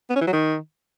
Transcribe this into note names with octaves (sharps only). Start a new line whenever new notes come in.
B3
C#4
E3
F#3
D#3